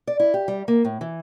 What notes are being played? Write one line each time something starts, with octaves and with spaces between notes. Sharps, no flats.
D5
E4
G4
G3
A#3
A2
E3